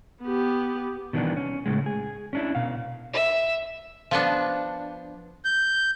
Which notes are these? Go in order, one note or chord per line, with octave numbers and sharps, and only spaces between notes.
B3 G4
B2 D#3 E3 G3 D4
C#4
A2 C#3 G#3
G#4
C#4 D4 E4
B2 F5
E5
F3 B3 D4
G6